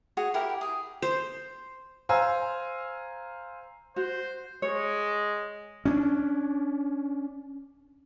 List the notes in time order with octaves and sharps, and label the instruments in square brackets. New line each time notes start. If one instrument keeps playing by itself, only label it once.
[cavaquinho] F#4 G#4 C#5
E4 F#4 G4 A#4
G#4
[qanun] C5
[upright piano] C5 F5 G#5 A#5 E6
[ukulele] F#4 [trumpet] C5
[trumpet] G#3 [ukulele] C#5
[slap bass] C#4 D4